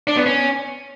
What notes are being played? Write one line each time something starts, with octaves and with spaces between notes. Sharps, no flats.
D4
B3
C#4